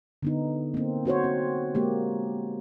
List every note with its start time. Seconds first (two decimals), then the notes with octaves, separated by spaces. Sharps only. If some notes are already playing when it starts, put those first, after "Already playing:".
0.23 D3 B3 D#4
0.74 A#3 C4
1.05 C4 F#4 C5 C#5
1.24 C4
1.75 G#3 A#3 G4